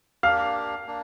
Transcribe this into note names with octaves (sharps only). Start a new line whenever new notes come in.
A#3 D4 G4 F5 F6
A#3 D4